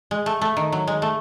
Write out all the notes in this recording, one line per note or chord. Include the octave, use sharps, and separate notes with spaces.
G#3
A3
A3
D#3
F#3
G#3
A3